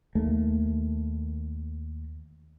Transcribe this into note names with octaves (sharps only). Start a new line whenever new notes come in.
D#2 A3 A#3